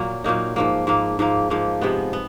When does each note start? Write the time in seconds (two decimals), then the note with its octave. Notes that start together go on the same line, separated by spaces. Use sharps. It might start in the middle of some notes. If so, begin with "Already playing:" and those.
Already playing: A#2 F#3 A#3
0.24 A#2 F#3 A#3 D#4
0.56 G#2 F3 A#3
0.87 G#2 F3 A#3
1.19 G#2 F3 A#3
1.50 G#2 F3 A#3
1.81 C3 F3 G#3 B3
2.13 B3